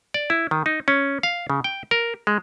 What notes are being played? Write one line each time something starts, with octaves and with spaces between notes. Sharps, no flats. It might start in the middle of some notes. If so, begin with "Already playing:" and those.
D5
E4
D#3
D#4
C#4
F5
C#3
G5
A#4
G#3